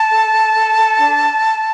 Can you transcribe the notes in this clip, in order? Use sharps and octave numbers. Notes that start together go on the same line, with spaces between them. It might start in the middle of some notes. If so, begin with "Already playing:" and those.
Already playing: A5
A4
A4
A4
A4
D4